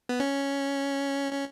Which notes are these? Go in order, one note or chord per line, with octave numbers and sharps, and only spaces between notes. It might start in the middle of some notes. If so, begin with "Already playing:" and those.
B3
C#4
C#4